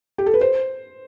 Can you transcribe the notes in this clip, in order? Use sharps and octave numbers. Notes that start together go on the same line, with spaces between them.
G4
A4
B4
C5